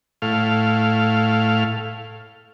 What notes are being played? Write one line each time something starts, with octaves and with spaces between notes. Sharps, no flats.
A2 F5